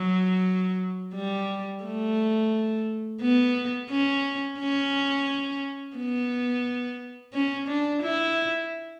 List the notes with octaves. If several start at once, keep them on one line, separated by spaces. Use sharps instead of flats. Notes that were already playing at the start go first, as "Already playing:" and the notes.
Already playing: F#3
G3
A3
B3
C#4
C#4
B3
C#4
D4
E4